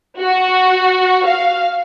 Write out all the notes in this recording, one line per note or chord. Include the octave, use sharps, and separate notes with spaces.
F#4
F5